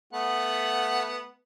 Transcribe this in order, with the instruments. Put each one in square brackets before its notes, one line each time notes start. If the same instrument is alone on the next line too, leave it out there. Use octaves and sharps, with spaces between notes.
[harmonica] A3 B3 F#5